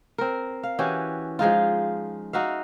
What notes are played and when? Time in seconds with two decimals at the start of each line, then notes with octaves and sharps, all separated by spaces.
0.18 C4 A#4
0.63 F5
0.79 E3 C#4 F#4 G4
1.39 F3 G#3 D#4 F4
2.33 D#4 F#4 E5 F5